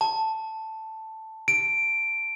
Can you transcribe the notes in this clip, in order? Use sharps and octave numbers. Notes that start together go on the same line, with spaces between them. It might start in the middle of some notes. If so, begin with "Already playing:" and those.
A5
D7